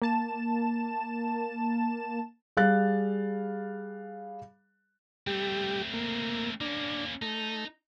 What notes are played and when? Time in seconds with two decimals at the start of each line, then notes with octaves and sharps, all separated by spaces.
0.02 A#3 A5 E7
2.57 G3 G#4 F5 F#6 A6
5.27 G3 A3 C4 G4
5.94 A#3
6.61 A#3 C#4 D4
7.22 A3 D#4